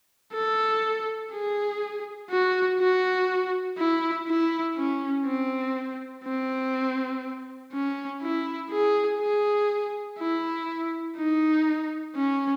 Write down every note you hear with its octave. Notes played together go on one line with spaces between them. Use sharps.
A4
G#4
F#4
F#4
E4
E4
C#4
C4
C4
C#4
E4
G#4
G#4
E4
D#4
C#4